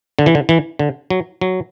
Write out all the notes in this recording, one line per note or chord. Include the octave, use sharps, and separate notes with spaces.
D3
E3
D3
E3
D3
F#3
F#3